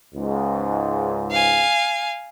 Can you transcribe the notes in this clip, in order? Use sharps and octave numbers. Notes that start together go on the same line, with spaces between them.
C#2 G#2
F5 G#5